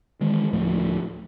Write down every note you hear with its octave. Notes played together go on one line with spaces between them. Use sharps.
D#3 E3 G#3
D2 A2 F3 A3